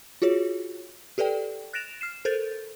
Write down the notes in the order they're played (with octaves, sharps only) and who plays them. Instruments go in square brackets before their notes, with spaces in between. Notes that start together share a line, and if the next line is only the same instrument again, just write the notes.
[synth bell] F4 F#4 G#4 C#5
G4 A4 B4 D5 G5
F#6 A6 A#6 D7 E7 F7
F6 C7 E7
A4 A#4 C5 G6 A6